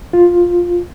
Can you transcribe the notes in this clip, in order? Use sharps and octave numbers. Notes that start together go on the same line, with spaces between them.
F4